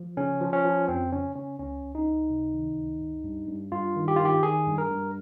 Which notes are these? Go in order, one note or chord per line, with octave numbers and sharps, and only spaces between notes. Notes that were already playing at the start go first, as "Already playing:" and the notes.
Already playing: F3
C#3 C#4
F3
C#4
F3
F2 C4
C#3 C#4
C#3 C#4
C#2 C#4
C#2
D#4
C#2
C3
D#3
C#2
G2
G2
G2
G2 F4
D#3
G4
D#3 F4
G4
D#3 G#4
G2
A#4
G2